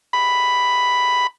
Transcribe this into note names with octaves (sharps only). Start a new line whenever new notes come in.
B5